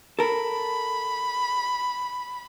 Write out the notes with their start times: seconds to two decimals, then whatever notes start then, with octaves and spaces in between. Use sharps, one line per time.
0.19 A4 A#4 B5